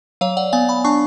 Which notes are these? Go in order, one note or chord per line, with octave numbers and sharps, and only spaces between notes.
F#3 C#5 F5
D5 F#5
B3 F5 G#5
G#5 B5
D4 A5 C#6